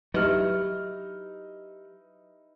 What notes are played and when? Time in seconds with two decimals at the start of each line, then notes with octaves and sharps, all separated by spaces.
0.14 F#3 D#4 E4 G4 B4 F6